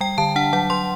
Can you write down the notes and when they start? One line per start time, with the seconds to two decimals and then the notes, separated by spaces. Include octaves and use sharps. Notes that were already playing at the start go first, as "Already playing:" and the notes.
0.01 G3 G5
0.18 D3 A5
0.36 D4 F#5
0.53 F#3 F#5
0.70 F#3 C6